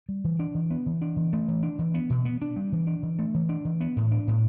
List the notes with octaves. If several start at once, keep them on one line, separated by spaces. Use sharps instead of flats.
G3
E3
D4
E3
B3
E3
D4
E3
A3
E3
D4
E3
B3
B2
B3
D4
G3
E3
D4
E3
A3
E3
D4
E3
B3
A2
D4
A2